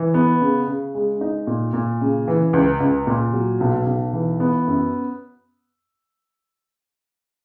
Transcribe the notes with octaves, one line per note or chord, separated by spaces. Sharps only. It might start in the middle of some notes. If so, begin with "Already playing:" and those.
Already playing: E3
B3
C#3
C#3
G#3
D#4
A#2
A#2
C#3
E3
C#2
C#2
A#2
F#3
B1
B1
E3
B3
F#2